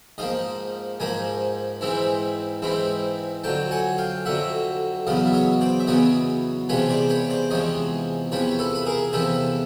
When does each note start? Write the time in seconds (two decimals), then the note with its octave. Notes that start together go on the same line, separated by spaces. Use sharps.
0.18 G#2 F3 A#3 D#5 F5
1.00 G#2 F3 A#3 G#5 A#5
1.81 G#2 E3 G#3 C4 E4
2.62 G#2 E3 G#3 C4 E4
3.44 F2 D3 F#3 G5 A5
3.71 F#5 G#5
3.98 F5 G5
4.25 F2 D3 F#3 E5 F#5
5.07 E2 C#3 F#3 B3 D#5 F5
5.26 E5
5.33 C#5 D#5
5.61 C5 D5
5.79 E5
5.87 E2 C#3 F#3 B3 C#5 D#5
6.69 E2 C3 F3 G#3 B4 C#5
6.89 C5 D5
7.09 B4 C#5
7.30 C5 D5
7.51 E2 C3 F3 G#3 C#5 D#5
8.32 E2 C3 F3 B4 C#5
8.59 A4 B4
8.75 B4
8.86 G#4 A#4
9.13 E2 C3 F3 A4 B4